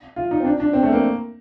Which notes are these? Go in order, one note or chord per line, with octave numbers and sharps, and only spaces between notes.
F4
D#4
C4
D4
D4
C4
A3
A#3